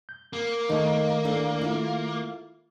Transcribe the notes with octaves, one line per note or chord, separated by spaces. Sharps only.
G6
A#3
D#3 A3 D#4
D2 D3 E4
E4 F4